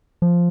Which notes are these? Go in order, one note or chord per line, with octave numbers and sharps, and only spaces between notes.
F3